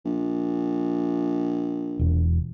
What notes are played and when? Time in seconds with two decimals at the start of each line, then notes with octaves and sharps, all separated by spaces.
0.05 A#1
1.99 E1